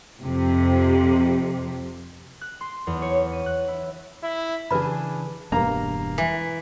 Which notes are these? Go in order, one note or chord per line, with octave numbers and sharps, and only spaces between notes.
F2 C3
F#6
C6
E2
C#5
C#5
D#7
F#6
E4
E4
C#3 E3 D4 G#4 B4 B5
E1 G2 A#3 A#5
E3